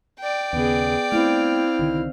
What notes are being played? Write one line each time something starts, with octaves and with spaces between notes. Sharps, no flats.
D5 G5
D#2 C#3 B3 G#4
A3 B3 C4 E4 F5
C2 D3 D#3